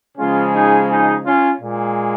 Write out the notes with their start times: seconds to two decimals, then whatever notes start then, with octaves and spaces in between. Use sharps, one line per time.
0.17 C#3 F3 G#3 C#4 F4
0.53 D#4 G#4
0.89 D#4 G#4
1.25 C#4 F4
1.60 A#2 G#3